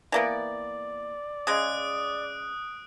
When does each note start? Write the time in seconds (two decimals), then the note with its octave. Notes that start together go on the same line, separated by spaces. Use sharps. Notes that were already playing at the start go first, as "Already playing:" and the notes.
0.12 E3 A#3 B3 D5
1.47 C#3 G#3 D#6 F#6 D7